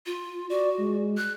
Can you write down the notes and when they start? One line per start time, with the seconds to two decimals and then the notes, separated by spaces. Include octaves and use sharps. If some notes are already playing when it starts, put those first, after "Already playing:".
0.06 F4
0.50 F#4 D5
0.78 G#3
1.17 F#6